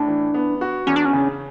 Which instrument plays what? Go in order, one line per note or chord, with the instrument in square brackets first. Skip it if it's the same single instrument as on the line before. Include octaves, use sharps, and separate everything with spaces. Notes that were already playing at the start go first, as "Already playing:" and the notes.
Already playing: [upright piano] A2 [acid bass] D4
[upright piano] E3
B3
F#4
[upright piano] E2 [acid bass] C#4
[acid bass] D4
C#4
[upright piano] C#3